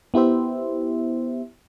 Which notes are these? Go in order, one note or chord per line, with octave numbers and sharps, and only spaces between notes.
B3 E4 G4 C5 E5